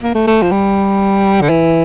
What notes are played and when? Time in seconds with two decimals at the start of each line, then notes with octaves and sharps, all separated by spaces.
0.03 A#3
0.15 A3
0.27 A3
0.42 F3
0.51 G3
1.41 D3
1.49 E3